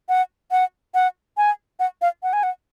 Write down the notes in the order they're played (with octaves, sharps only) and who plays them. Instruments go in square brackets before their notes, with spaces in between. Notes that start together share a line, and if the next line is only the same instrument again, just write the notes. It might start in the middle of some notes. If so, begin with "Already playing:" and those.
[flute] F#5
F#5
F#5
G#5
F#5
F5
F#5
G#5
F#5